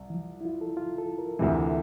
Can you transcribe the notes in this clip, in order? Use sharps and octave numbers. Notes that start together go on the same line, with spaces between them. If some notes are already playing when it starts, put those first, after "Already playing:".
Already playing: C2
E3
F3
E4
F4
A4
F4
A4
A#4
D2 C3 E3